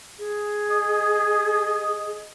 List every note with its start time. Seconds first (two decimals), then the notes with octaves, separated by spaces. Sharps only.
0.19 G#4
0.70 D#5